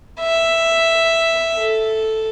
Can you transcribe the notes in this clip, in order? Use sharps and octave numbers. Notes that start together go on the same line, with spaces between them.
E5
A4